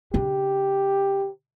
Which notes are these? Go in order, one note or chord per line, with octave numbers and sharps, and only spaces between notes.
C#3 D4 G4